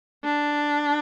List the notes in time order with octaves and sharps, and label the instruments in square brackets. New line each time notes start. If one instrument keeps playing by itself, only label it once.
[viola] D4